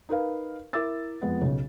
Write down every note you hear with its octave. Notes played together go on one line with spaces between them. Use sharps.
D#4 A#4 B4 F5
E4 A#4 E5 D6 E6 A6
F2 G#3 B3
B1 C#3